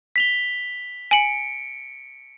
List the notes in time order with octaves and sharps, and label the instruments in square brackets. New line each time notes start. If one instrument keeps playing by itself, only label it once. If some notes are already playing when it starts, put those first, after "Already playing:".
[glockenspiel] B6 F7 G7
[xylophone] G#5 F#7 [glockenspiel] C#7 D7